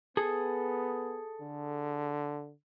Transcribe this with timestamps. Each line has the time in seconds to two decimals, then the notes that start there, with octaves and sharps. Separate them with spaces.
0.17 B3 G#4 A4
1.42 D3